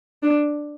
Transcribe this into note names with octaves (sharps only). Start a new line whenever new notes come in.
D4